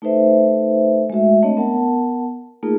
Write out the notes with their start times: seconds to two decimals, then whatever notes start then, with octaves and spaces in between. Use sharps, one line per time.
0.02 A3 D#4 A4 B4 C5 E5
1.10 G#3 A3 F#4 E5
1.43 A3 C4 D4 C#5 D#5
1.57 B3 A#4 F#5 A5
2.63 A3 A#3 D#4 F4 G#4 A#4